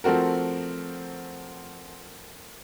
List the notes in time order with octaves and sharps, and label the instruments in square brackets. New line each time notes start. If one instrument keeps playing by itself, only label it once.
[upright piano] F3 A3 C4 F#4 A#4